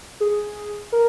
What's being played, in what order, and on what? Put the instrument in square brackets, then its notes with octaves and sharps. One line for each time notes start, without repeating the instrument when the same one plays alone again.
[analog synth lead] G#4
A#4